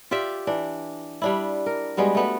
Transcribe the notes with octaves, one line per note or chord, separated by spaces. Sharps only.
F4 G4 D5 E5
E3 D4
G3 D4 E4
A#4
G3 G#3 B3 F#4
A3 B3 F#4